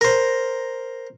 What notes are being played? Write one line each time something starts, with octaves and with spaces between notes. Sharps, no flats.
A#4 C5